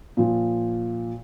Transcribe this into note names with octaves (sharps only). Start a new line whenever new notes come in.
A#2 F3